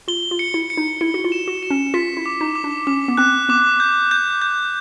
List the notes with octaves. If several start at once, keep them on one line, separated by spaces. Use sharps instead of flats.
F4 G7
F4
C#7
E4
C#7
D#4
E4 C#7
F#4
F4
E7
F#4
E7
C#4
F4 B6
E4
D6
D#4
D6
D4
C#4 D6
B3
C4 F#6
B3 D6
G6
G6
G6